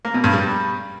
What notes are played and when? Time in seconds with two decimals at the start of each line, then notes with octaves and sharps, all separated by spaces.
0.05 A#3
0.14 B2
0.24 G2
0.33 G3